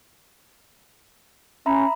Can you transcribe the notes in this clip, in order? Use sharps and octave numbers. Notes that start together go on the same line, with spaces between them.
C#4 E5 A#5 B5